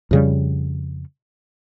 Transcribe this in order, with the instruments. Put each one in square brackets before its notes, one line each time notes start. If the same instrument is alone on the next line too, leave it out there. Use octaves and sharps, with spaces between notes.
[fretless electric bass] F2 C#3 G3